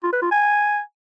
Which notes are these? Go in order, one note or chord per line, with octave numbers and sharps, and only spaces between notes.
F4
B4
F4
G#5